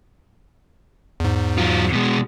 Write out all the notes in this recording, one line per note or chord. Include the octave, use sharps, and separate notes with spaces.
E2 G#2
F#3 F4
B2 G#3